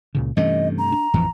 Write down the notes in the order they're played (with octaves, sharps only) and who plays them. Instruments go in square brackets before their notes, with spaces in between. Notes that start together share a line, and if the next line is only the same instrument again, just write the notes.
[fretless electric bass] C#2 A#2 C#3
[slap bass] G2 C3 A3 [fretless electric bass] E3 C#4 [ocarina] D#5
[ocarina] A#5
[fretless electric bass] D4
[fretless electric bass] A1 E3 F3 [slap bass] F2